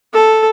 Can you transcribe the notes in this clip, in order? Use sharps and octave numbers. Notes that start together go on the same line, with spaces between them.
A4